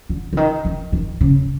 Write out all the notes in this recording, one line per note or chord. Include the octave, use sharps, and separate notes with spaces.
D3
D3
D#3
D#3
D#3
C#3